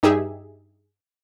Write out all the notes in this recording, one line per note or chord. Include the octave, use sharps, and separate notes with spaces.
G2 D#4 G4 G#4 E5